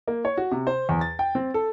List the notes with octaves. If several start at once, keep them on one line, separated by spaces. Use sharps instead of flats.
A#3
C#5
F#4
C3
C5
E2
A6
G5
C4
A4